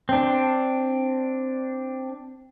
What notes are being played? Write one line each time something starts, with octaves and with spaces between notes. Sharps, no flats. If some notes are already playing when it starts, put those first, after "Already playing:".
C4 D4